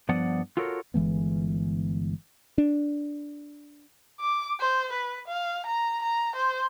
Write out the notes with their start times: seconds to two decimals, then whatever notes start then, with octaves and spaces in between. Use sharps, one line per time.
0.09 G2 F3 B3 D5 F#5
0.57 F4 F#4 A4 A#4 C#5
0.94 G1 E3 G#3 B3
2.58 D4
4.20 D6
4.60 C5
4.93 B4
5.28 F5
5.66 A#5
6.03 A#5
6.36 C5